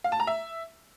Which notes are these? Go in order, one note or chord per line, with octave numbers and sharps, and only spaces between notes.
F5
A5
A#5
E5